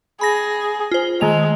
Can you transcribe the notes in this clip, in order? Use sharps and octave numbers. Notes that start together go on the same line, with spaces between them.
G#4 B5 A#6
F4 C5
D#3 G#3 A3 F7